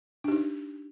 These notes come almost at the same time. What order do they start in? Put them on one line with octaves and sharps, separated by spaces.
D4 G4 D#4